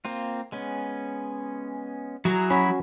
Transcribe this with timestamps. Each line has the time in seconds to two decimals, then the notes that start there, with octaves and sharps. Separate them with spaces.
0.05 A#3 C4 F4
0.52 G#3 B3 C#4
2.25 F#3 E4 G#4 A#5
2.50 C#4 F#4 B5